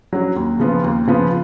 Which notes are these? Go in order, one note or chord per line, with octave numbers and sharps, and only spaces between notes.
F#3 C#4 F#4
D#2
C#3 F3 B3 F4
D#2
C#3 F3 B3 F4